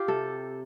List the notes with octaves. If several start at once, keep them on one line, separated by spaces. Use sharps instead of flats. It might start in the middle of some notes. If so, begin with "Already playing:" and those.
Already playing: F4 G4
C3 A4